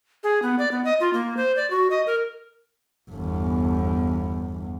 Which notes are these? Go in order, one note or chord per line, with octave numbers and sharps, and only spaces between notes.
G#4
B3
D5
B3
D#5
F4
A#3
C5
D5
F#4
D#5
A#4
G1 E2